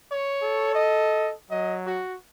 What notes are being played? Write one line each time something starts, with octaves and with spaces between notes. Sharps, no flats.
C#5
A4
D#5
F#3 D#5
F#4